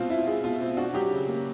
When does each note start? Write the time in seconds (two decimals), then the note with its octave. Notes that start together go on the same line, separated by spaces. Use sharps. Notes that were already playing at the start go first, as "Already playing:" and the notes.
Already playing: B2 C4 F4
0.10 E4
0.27 G#3
0.44 B2 F4
0.61 C4
0.77 D4 F#4
0.94 F#3 G4
1.11 C#3
1.28 A#3